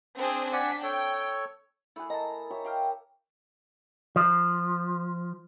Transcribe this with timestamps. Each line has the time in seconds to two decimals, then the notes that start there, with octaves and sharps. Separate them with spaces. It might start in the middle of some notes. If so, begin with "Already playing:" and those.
0.16 C4 D4 G#4
0.53 D4 D5 F#5 G#5 B6
0.83 A4 C#5 G5
1.96 A3 E4 G#4 F#6
2.10 A#4 D#5 A5 A#5
2.50 G4 C#5 E5
2.65 G4 F5 G5 F6
4.16 F3